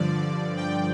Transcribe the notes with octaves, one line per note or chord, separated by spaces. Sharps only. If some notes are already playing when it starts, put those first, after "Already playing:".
Already playing: G2 D3 F3 D5
G5